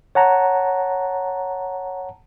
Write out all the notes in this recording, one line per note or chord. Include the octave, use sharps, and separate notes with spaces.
C#5 F#5 A5 A#5